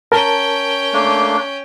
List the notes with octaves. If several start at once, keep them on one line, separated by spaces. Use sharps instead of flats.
C#4 A#4 G5 A5
A3 A#3 D4